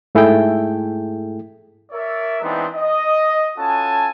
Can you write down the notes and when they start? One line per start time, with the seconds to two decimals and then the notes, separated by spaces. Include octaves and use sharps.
0.15 G#2 A3 E4 G#4 A4 G5
1.92 A#4 C#5 D5 E5
2.41 E3 G#3 B3 C4 D4 D#4
2.75 D#5
3.58 C#4 F4 F#4 A4 G#5 A5